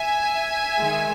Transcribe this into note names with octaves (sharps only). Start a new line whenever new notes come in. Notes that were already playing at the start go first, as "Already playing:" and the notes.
Already playing: E5 G#5
D#3 G#3